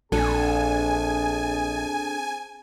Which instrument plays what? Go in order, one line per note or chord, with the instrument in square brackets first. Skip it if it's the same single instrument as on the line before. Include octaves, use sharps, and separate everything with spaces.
[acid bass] A#1 [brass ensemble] C4 G#4 A5 [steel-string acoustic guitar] D4 A4 [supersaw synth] G#5